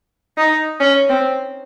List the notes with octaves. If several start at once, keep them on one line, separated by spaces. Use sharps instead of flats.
D#4
C#4
C4